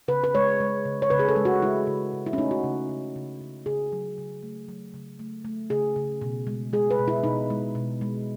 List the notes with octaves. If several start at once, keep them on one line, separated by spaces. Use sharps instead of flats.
C#3 B4
B4
G#3 C#5
G#3
C#3
C#5
C#3 B4
G#4
A4
G#3
F#4
G#3 E4
C#3
C#3
E4
C#4
A3 D#4
F#4
C#3
C#3
C#3
C#3
C#3 G#4
F#3
C#3
A3
F#3
C#3
A3
A3
C#3 G#4
C#3
B2
G#3
G#3 G#4
B4
B2
E4
B2 D#4
G#3
B2
G#3